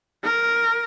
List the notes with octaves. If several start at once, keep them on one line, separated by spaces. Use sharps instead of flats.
A#4